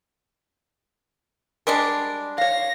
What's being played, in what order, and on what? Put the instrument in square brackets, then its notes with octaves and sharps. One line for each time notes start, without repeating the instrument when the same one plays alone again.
[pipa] G3 G#3 D4 [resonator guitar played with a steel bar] A#4
[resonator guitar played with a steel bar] C#5 F5 [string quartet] A#6